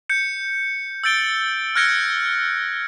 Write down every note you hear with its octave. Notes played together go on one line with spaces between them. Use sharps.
G6 C#7
E6 G6 A6 D7 G7
F6 F#6 G#6 A#6 C#7 D7